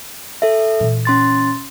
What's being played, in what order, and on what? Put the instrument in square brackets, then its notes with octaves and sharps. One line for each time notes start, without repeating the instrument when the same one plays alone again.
[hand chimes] A4 E5
[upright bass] A#2 E3
[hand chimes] C#4 C6 A6